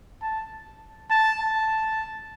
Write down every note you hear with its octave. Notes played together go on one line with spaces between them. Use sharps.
A5
A5
A5